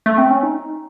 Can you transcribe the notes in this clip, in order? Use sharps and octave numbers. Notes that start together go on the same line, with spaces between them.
A3
C4
C#4
D#4